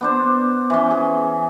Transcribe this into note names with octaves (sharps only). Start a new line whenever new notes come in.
B3 D4 C5
E3 C#4
G#4